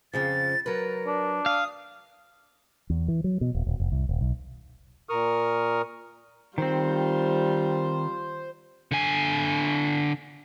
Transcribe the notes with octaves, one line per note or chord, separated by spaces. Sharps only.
F2 C#3 F3 A6
F#3 A#4 B4
D4
F5 D#6
E2
E3
F#3
B2
D#1
D#1
F1
C2
D#1
B1
A#2 A#4 C#6 D#6 F6
D#3 G3 C4 F4 C5
D3 G#5